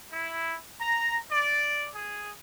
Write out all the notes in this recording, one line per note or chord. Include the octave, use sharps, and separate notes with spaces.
E4
A#5
D5
G#4